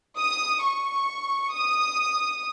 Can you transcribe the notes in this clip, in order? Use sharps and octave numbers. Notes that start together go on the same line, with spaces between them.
D#6
C#6
D#6